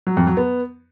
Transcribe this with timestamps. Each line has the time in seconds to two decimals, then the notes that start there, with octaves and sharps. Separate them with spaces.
0.07 F#3
0.17 F2
0.27 F#3
0.37 B3